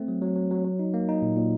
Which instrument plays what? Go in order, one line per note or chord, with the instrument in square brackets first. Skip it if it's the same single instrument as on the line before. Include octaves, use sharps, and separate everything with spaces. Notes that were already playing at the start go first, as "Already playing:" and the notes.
Already playing: [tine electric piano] A3 C4
F#3
F#3
F#3
F#3
F#3
D#4
A#3
D#4
A#2
A#2